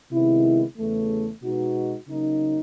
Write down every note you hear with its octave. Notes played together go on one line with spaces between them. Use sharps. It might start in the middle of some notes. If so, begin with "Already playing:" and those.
C3 D#3 G#3 B3 E4
E2 C#3 E3 A3
B2 G#3 B3 D#4 F#4
C#3 F#3 A#3 D#4